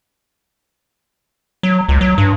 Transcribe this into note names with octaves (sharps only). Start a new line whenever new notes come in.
F#3
C#2
F#3
G2